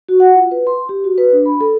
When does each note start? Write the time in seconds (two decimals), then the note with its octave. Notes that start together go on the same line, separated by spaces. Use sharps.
0.09 F#4
0.20 F#5
0.35 F4
0.51 B4
0.67 C6
0.89 G4
1.04 F#4
1.18 B4
1.33 D4
1.46 B5
1.61 A4